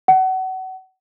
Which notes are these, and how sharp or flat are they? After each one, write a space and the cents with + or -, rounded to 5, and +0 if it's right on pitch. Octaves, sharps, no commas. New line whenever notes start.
F#5 +30